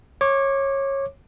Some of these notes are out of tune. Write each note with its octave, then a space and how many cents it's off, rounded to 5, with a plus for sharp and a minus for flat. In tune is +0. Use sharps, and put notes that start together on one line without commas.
C#5 -20 D6 +0